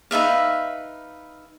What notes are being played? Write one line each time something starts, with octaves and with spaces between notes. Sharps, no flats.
D#4 B4 E5 F5